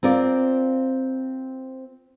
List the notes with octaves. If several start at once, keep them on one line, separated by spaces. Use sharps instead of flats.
C4 F4 A#4 D5